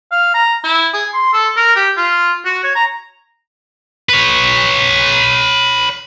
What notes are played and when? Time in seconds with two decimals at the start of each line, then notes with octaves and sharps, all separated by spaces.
0.12 F5
0.34 A#5
0.64 E4
0.93 G#4
1.14 C6
1.33 A4
1.56 A#4
1.76 G4
1.97 F4
2.45 F#4
2.64 C#5
2.75 A#5
4.09 B4 C#5